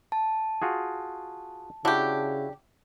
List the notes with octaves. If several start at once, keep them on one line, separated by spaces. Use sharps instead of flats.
A5
F4 F#4 G#4
C#3 D4 E4 F#4 G4